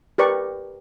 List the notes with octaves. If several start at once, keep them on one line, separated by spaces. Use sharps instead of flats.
G4 A#4 B4 D5 C#6